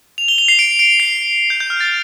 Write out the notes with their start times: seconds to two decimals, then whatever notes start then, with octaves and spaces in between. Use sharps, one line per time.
0.18 F7
0.28 G7
0.38 F7
0.48 C7
0.59 D7
0.79 D7
1.00 C7
1.50 G6
1.60 G6
1.70 F6
1.80 A6